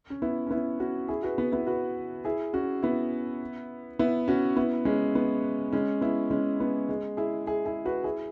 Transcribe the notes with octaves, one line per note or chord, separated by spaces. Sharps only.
C#4
B3 E4
C#4
B3 E4
C#4 F#4
E4 G#4
F#4 B4
B3
B3 E4
F#4 B4
E4 G#4
C#4 F#4
B3 E4
B3 E4
C#4 F#4
B3 E4
G#3 C#4
B3
G#3 C#4
B3 E4
G#3 C#4
B3
G#3
E4 G#4
E4 G#4
E4 G#4
F#4 B4
E4 G#4